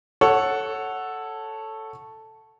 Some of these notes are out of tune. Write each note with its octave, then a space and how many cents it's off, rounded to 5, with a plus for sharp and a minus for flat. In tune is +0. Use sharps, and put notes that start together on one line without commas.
A4 +0 C#5 -10 F#5 +0